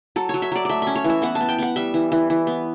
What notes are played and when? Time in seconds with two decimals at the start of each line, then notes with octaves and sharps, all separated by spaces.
0.16 F#3 A4
0.29 F#3 C#5
0.42 E5
0.52 F#3 D5
0.65 A3 D5 E5
0.82 C#4 E5
0.95 C#5
1.04 E3
1.10 E5
1.22 B3 F#5
1.35 A5
1.41 B3
1.49 G5
1.58 B3 F#5
1.76 G3 E5
1.94 E3
2.12 E3
2.30 E3
2.47 B3